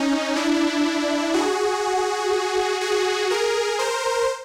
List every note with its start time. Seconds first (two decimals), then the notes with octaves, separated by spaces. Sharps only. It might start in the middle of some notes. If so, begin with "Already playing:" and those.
Already playing: C#4 D#4
0.36 D4 E4
1.34 F#4 G#4
2.81 F#4 G#4
3.30 G#4 A#4
3.79 A#4 C5